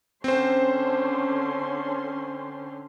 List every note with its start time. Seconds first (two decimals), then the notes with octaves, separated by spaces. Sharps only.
0.24 D3 C4 C#4 C5 C6